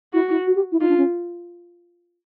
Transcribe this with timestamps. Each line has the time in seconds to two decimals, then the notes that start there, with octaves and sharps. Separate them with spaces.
0.13 E4 F#4
0.30 E4
0.47 F#4
0.55 G4
0.72 E4
0.80 D#4 F4
0.89 D4
0.97 C#4